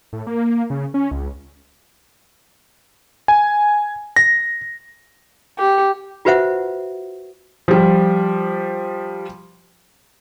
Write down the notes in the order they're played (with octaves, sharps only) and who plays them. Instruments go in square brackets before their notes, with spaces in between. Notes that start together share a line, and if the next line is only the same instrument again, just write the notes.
[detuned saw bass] A2
A#3
C#3
C#4
C#2
[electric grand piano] G#5
A#6
[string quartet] G4
[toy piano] F4 F#4 B4 C5 E5 F#5
[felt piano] F3 G3